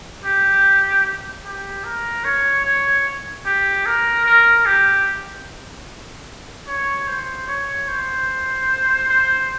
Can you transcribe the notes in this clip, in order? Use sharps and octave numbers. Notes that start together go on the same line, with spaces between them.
G4
G4
A#4
C#5
C#5
G4
A#4
A#4
G4
C#5
C5
C#5
C5
C5